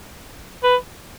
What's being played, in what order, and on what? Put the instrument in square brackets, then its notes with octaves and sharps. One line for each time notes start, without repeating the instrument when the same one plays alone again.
[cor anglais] B4